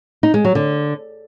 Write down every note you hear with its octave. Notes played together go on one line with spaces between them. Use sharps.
D#4
G#3
F#3
D3